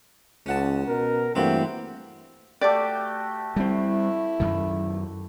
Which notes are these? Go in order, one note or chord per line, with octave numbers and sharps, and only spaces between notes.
C#2 C#4 F#5 A5
B2 A#4
G2 E3 A3 A#3 C4 E4 F#4 G4
A3 F#4 G4 D5
G3 C4 E4
F#2 D#3